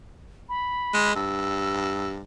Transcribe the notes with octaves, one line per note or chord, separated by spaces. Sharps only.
B5
G#3
G2 E6